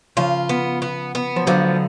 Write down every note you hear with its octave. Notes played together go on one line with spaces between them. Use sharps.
C#3 F3 F4
B3
B3
B3
F3
D3 F3 F#3